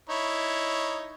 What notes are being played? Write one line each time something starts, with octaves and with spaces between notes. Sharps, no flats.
D#4 E4 C#5